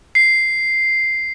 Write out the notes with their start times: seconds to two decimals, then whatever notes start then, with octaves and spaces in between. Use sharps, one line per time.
0.15 C7